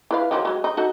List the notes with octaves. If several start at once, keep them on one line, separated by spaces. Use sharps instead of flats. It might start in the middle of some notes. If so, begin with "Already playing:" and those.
E4 B4 F5
D#3 F3 F#3
F#3 G#3
D#4
D#4 F#4 A4